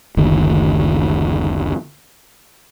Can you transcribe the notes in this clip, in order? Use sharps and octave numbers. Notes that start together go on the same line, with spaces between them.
F#1 D2 D#3